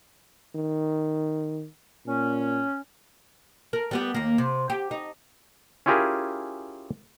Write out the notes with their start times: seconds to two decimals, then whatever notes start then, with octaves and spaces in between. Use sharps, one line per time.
0.55 D#3
2.06 A#2 C#4
3.73 A#4
3.91 G3 B3 G4
4.14 D#2 A#3
4.38 C3
4.70 G4
4.91 D#4
5.86 C#4 E4 F4 G4 G#4 A#4